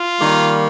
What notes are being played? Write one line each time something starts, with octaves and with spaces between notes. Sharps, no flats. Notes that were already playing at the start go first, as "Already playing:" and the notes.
Already playing: F4
D#3 G3 A#3